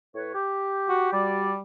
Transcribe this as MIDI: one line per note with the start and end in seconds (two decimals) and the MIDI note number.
0.14 0.31 45
0.14 0.31 71
0.14 0.31 73
0.34 1.09 67
0.89 1.12 66
1.13 1.61 55
1.13 1.51 66
1.13 1.51 67
1.13 1.51 74